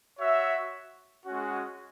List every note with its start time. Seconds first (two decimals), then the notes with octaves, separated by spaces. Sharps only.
0.18 F#4 C#5 E5
1.25 G#3 C#4 F#4